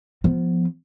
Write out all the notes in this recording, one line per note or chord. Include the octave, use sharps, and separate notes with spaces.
F3 B3